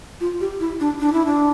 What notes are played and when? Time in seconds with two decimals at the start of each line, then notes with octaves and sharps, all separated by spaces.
0.21 F4
0.41 G4
0.60 E4
0.80 D4
1.00 D4
1.13 E4
1.25 D4